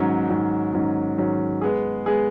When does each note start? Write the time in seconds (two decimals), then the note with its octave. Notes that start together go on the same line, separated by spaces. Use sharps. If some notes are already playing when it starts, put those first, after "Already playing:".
Already playing: G#2 D#3 F#3 C#4
0.29 G#2 D#3 F#3 C#4
0.73 G#2 D#3 F#3 C#4
1.18 G#2 D#3 F#3 C#4
1.61 G#3 B3 G#4
2.06 G#3 B3 G#4